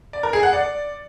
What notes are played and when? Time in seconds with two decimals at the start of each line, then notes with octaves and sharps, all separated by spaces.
0.13 D5
0.23 A#4
0.33 G#4
0.43 F#5
0.53 D5